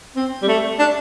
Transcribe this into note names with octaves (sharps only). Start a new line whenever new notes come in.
C4
G3
A3
D4